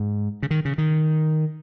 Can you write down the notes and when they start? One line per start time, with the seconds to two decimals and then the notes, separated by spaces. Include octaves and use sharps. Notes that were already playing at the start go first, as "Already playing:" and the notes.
Already playing: G#2
0.43 C#3
0.51 D#3
0.65 C#3
0.78 D#3